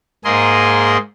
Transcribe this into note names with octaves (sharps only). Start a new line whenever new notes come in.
G#2 A#3 G#4 D#5 C6